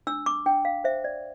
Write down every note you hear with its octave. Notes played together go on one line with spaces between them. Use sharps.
D4 E6
D6
D4 G5
F5
C5 E5
D5